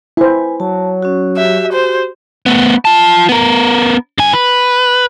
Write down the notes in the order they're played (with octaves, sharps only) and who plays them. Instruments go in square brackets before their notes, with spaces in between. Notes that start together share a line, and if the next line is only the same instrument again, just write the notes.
[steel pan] E4 C5 [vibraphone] B4 G#5
[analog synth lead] F#3 [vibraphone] A5
[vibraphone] C#4 F#4
[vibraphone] F#4 G4 [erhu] E5
[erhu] C5
[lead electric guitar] A3 B3
F4 A5
B3 A#4
G2 G#5
B4